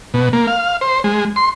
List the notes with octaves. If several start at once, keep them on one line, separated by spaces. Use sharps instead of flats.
B2
A#3
F5
C5
G#3
C6